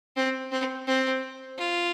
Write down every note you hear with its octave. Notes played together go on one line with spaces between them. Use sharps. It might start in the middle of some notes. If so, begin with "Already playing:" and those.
C4
C4
C4
F4